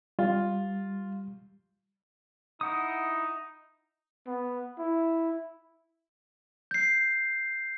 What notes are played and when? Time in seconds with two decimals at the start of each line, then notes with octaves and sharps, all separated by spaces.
0.19 G3 F4
2.61 D#4 E4 F#5 D#6
4.27 B3
4.79 E4
6.71 G6 C7